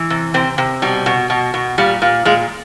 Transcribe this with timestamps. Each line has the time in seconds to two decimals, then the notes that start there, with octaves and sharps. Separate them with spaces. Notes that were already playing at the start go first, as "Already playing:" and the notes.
Already playing: E3
0.10 C3
0.34 C3 C4
0.58 C3
0.82 B2 G3
1.06 B2
1.30 B2
1.54 B2
1.78 A#2 G3
2.02 A#2
2.25 A#2 G#3